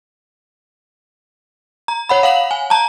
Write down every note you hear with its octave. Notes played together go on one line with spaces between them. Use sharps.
A#5
C#5 F#5 B5
F5 F#5 F#7
G#5
A5 A#5